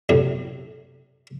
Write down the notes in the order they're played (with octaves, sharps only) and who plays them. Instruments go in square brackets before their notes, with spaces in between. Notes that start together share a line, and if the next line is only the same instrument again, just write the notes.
[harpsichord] B1 F#2 A2 C3